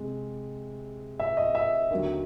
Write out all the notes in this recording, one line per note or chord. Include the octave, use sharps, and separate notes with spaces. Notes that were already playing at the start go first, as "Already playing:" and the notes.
Already playing: C3 G#3
E5
D#5
E5
D#2 D3 F#3